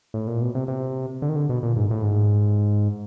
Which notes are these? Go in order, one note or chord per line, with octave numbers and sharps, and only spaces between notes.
A2
A#2
B2
C3
C3
D3
D#3
D3
B2
A#2
G#2
A2
G#2